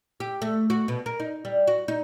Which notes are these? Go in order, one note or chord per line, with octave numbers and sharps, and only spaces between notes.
G4
A3
F#4
B2
A#4
D#4
G3
F#4
D#4